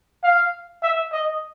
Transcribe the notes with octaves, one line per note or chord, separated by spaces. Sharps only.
F5
E5
D#5